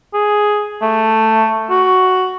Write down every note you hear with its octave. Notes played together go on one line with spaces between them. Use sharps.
G#4
A3
F#4